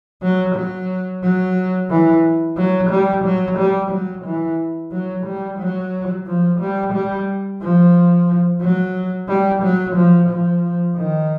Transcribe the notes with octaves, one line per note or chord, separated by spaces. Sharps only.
F#3
F#3
F#3
E3
F#3
G3
F#3
G3
F#3
E3
F#3
G3
F#3
F3
G3
G3
F3
F#3
G3
F#3
F3
F3
D#3